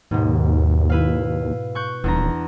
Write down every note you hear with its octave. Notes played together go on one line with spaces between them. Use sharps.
D#2 G#2 B2
E4 B4 F5
C#6 F#6 G6
D#1 E2 D4 A#5